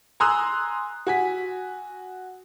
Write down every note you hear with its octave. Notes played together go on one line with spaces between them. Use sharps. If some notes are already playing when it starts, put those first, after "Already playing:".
G#5 A#5 C6 D#6 E6 F#6
F#4 G#5 B6